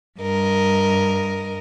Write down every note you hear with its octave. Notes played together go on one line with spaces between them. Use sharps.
G2 A#4 D#5